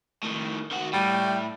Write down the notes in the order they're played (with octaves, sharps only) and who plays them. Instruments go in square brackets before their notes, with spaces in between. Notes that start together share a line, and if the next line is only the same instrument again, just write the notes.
[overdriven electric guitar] A2 D#3
D#3 F#4
[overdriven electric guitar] A2 [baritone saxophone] G3